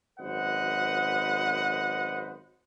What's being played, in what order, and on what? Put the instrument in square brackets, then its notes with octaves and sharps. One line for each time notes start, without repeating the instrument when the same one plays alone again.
[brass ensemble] G#1 F#2 B4 C5 D#5 F#5